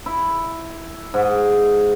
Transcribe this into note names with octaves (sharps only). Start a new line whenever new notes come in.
E4
G#2